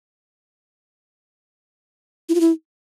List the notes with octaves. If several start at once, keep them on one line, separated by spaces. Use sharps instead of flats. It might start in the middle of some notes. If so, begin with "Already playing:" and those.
E4
F4
E4